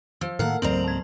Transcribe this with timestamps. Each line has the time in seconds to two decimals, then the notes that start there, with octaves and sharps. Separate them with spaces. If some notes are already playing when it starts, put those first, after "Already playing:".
0.21 F3 E6
0.39 A2 D#3 A#3 A4 A#4 F5 F#5 F6
0.62 C#2 G#2 F#3 C4 C5 A#5 F#7
0.84 A5 G#6